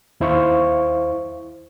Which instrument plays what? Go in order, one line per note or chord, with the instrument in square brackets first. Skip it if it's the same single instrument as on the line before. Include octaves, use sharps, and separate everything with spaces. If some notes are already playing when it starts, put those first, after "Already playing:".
[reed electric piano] D#2 E4 C5 F5 C#6